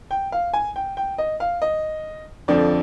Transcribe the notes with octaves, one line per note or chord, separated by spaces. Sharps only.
G5
F5
G#5
G5
G5
D#5
F5
D#5
F2 D3 F3 D5